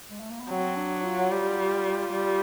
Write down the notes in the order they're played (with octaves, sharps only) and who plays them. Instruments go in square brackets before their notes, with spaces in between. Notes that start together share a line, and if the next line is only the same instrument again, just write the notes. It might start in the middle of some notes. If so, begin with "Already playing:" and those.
[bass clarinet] G#3
A3
A#3
B3
[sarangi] F#3 [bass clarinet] C4
[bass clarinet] D4
F4
[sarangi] G3
G3